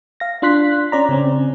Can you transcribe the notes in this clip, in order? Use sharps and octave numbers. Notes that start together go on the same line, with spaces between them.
F5 A#6
D4 F4 C6 F#6 B6
C#4 D5 A#5
C#3 C4 C#4